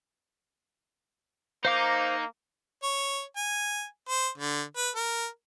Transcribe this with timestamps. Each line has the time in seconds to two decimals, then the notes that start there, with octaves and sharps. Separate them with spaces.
1.65 A#3 D#4 C5 F5 D6
2.83 C#5
3.37 G#5
4.09 C5
4.38 D3
4.77 B4
4.96 A#4